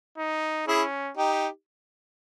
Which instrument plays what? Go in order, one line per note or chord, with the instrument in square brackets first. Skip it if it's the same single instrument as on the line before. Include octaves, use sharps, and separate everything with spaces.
[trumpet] D#4
[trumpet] C#4 [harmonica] E4 G#4
[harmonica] D#4 G4